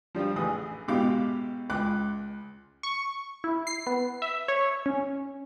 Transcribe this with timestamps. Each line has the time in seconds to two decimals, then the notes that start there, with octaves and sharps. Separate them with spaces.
0.15 F3 G3 D4 F4
0.36 A1 E3 G#4 D#6
0.88 G#2 B2 E4 G4 F5 D6
1.70 C#2 D6 F#6
2.83 C#6
3.44 E4
3.67 C7
3.87 B3
4.22 E5
4.48 C#5
4.86 C#4